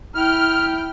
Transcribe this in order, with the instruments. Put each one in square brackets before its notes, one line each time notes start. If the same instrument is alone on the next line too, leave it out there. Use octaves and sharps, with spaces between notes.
[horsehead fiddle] E4 G5 [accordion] F6